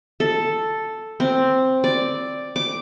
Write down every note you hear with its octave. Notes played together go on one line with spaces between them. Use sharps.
A4
C4
D5
D6